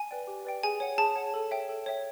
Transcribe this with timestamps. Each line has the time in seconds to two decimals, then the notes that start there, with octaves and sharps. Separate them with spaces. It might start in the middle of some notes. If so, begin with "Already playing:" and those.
Already playing: G#5
0.11 B4 D5 G5
0.27 G4
0.45 B4 D5 G5
0.63 G#4 G#5
0.80 C#5 F#5
0.98 G#4 A5
1.16 C#5 F#5
1.34 A4
1.51 C#5 E5 G5
1.69 A4
1.86 C#5 E5 G5